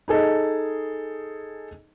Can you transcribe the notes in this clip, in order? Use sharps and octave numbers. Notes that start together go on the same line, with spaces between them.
D#4 G#4 A4 D#5